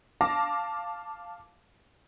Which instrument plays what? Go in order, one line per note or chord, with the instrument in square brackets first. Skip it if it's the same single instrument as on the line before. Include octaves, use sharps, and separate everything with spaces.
[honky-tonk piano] F5 A5 D6 A#6